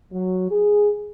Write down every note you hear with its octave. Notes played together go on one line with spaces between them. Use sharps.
F#3
G#4